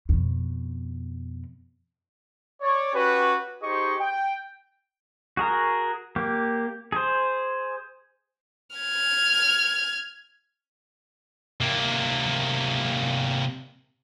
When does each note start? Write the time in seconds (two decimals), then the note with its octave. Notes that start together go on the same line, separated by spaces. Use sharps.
0.09 F2 B2
2.61 C#5 D5
2.94 C#4 F#4 G4 B4
3.62 D#4 G4 G#4 C5 D#5 C#6
4.00 G5
5.37 F#4 G#4 A#4
6.16 A#3 G4
6.92 G#4 C5
8.76 F6 G#6
11.60 C3 A#3